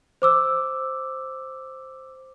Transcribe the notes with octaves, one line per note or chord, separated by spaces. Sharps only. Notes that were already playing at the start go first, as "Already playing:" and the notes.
C5 D6 E6